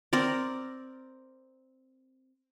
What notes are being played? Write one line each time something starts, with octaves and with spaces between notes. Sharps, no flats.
C4 A#4 D5